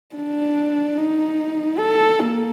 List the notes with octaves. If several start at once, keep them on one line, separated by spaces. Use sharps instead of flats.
D4
D#4
A4
A#3